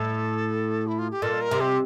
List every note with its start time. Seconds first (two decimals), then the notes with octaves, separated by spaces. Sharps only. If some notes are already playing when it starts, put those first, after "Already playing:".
Already playing: A2 A4
0.87 E4
0.99 F4
1.11 G4
1.22 A#2 A4
1.41 A#4
1.51 C3
1.60 G4